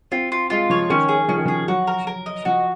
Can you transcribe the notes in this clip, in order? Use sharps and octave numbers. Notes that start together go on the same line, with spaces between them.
C4 F4
F4
G#3 F4
F3 C#5
D#3 C#4
G#4
F3 C#4
D#3
F3
G#4
F#3 F#4
A#4
A#4
D#5
F3 F#4